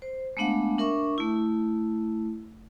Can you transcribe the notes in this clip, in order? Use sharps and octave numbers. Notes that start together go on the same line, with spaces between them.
C5
G#3 A3 B3 D4 F5 F#5
D4 A#4 E5 C#6
A3 E4